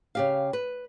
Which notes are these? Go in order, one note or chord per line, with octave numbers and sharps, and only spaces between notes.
C#3 G4 F5
B4